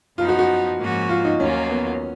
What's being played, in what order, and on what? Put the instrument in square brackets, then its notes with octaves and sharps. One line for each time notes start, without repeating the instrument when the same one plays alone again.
[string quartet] F#2 F3 B3 D#4 [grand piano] F4
[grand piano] F#4
F#4
[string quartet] G#2 F3 A#3 C#4 F#4
[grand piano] F4
D#4
[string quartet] D#2 D#3 F#3 A#3 F4 [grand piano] C#4
[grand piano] B3